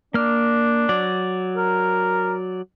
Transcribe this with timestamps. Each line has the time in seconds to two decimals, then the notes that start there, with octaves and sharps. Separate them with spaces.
0.14 A#3 D4 F6
0.89 F#3 D5
1.57 A#4